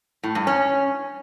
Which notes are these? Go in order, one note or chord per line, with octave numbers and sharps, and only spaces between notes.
A2
G2
C#4